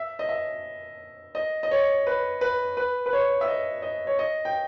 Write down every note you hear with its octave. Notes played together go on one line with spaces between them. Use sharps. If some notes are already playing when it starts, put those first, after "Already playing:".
Already playing: E5
D#5
E5
D#5
D#5
C#5
B4
B4
B4
B4
C#5
E5
D#5
D#5
C#5
D#5
G5